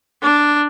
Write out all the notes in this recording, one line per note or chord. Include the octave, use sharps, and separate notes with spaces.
D4